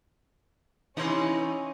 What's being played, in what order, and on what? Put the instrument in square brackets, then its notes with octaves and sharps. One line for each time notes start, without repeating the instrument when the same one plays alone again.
[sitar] C3 E3 D#4 [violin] C#4 [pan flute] E4 [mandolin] F5 C6 D#6